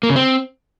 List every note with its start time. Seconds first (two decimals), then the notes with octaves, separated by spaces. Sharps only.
0.03 A#3
0.10 C#3
0.16 C4